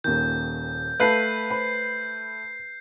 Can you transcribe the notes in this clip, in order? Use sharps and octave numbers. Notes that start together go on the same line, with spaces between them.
D#1 D#2 D#3 G6
A3 B4 F5 A5 G6 C7
C5 B5